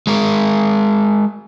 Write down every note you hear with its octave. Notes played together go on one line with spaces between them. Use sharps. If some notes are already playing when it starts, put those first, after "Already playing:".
G#3 A#4